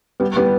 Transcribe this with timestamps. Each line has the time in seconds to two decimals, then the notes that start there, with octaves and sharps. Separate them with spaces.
0.20 G3 B3
0.36 G3 B3